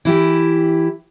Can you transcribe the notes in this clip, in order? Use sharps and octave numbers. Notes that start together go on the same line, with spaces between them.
E3 E4 G4